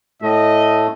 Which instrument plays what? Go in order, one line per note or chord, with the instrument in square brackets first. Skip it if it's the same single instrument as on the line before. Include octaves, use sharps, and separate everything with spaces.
[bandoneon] A2 A3 [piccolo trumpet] D#5